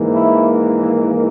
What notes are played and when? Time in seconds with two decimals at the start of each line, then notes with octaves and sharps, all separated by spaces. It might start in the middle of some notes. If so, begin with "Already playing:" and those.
Already playing: G#2 E3 A#3
0.15 E4